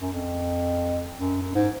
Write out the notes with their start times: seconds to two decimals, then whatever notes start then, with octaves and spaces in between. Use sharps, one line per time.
0.02 F#2
0.13 F2
1.17 F#2
1.42 F#2
1.55 G#2